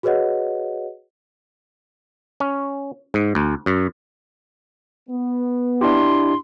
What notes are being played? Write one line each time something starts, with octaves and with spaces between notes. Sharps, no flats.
F#4 G#4 B4 C#5 D#5 F#5
C#4
G#2
D2
F#2
B3
D4 E4 G4 C6